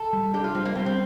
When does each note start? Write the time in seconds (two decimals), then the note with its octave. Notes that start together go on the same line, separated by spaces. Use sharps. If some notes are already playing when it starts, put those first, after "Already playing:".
Already playing: A4
0.13 G3
0.34 D4 G4
0.44 F4
0.55 G3 C4
0.65 A#3
0.75 G3 C4
0.86 C4